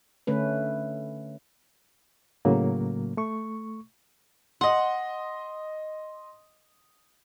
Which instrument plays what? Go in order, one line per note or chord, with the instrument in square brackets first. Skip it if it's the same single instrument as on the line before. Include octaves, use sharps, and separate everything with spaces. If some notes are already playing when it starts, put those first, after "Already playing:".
[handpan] D3 A3 C#4 B4
[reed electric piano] A2 C#3 F#3 A#3
A3 C#6
[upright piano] D#5 C6 [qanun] F#5